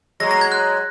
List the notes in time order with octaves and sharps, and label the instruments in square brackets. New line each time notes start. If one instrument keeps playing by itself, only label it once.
[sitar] F#3 G#3 [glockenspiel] A#6
[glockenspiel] A#6
G#6
F#6